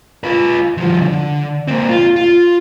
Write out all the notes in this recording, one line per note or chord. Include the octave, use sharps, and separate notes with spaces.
F4 B4
F3 G3
D3
A#3 C4
F4
F4